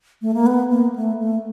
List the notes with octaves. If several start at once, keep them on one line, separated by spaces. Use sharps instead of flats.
A3
A#3
B3
A#3
A3
A3